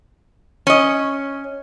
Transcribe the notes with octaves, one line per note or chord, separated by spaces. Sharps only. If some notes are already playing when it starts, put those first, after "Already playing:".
C#4 D#5